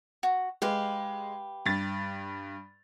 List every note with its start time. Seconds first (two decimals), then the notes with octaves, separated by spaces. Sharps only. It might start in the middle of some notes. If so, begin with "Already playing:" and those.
0.23 F#4
0.62 G#3 G4 B4 F5
1.66 G2 A6